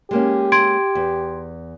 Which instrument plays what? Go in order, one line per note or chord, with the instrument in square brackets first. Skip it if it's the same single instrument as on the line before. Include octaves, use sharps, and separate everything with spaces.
[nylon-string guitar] G#3 A#3 C#4 [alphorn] G4
[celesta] C6 G#6 D7
[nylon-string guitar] E2